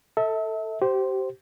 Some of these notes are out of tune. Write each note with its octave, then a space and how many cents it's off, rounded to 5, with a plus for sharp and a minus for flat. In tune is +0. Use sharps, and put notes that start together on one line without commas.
A4 +15 E5 -35
G4 -30 C5 +0